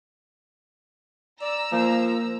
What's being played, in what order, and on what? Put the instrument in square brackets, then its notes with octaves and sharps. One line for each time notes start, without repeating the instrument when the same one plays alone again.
[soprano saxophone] D5 [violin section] A#5 E6
[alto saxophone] F3 [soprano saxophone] A#3